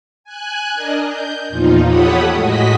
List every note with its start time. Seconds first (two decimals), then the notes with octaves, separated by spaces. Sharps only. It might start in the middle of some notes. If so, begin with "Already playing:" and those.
0.24 G#5 F#6
0.74 D4 A#4 D#5
1.05 G6
1.49 E2 A#2 F3 D#4 F4
1.86 G4 A4 C#5 F#5 B5 D#6
2.32 A2 G#3 F#4 D#5 B6